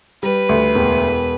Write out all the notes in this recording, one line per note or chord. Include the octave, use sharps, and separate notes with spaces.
G3 B4
D2
E1